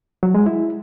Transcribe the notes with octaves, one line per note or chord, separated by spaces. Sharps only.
F#3
G#3
E4